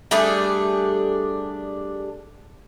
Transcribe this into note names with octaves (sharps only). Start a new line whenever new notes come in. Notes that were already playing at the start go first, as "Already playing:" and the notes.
G3 A3 D4 G#4